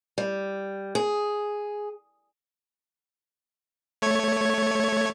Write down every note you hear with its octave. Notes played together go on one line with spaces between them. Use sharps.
G3
G#4
A3 C#5 G#6